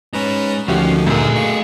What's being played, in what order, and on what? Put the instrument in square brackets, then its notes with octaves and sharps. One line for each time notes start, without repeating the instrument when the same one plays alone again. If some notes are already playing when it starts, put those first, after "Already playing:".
[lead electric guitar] G#3 D#4 [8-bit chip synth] C#4 B4 A#5
[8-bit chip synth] D2 D3 D#3 [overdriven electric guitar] F3 [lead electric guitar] C#4 [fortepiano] F#4 G4
[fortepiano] F#2 A#3 [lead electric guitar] A#2 [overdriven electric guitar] A3 G#4
[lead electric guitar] D#5 F5 [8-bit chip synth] C#6